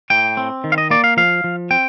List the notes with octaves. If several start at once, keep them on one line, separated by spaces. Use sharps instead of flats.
A2 G5
C4
D#3
F5
D#5
A#3 D5
F5
F3 F5
F3
C4 G5